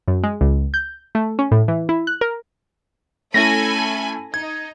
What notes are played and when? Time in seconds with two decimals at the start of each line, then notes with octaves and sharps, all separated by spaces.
0.08 F#2
0.23 G#3
0.41 C#2
0.74 G6
1.15 A3
1.39 C#4
1.52 A2
1.68 E3
1.89 E4
2.07 F#6
2.21 A#4
3.34 A3 C#4 E4 A4 G#5 B5 A#6
4.34 D#4 G#6